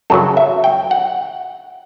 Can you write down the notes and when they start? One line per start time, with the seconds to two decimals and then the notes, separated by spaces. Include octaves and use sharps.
0.10 F#2 C#3 F#3 A4
0.37 E5
0.64 G5
0.91 F#5